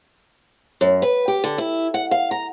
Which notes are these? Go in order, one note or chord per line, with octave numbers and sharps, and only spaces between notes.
F#2
B4
G4
D3
E4
F#5
F5
A#5